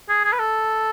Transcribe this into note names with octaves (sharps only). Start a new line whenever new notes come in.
G#4
G#4
B4
A4